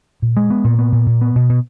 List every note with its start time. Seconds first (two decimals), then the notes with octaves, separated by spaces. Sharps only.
0.22 A#2
0.37 G#3
0.50 B3
0.64 A#2
0.79 B3
0.92 A#2
1.06 A#2
1.21 B3
1.36 B2
1.49 B2